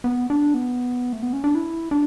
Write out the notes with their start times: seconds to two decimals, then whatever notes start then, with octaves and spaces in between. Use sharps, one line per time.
0.04 B3
0.30 D4
0.54 B3
1.13 A3
1.23 B3
1.33 C#4
1.44 D4
1.55 E4
1.91 D4